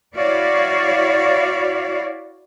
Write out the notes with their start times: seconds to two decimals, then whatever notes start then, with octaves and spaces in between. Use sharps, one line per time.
0.16 E4 F#4 C#5 D5 F5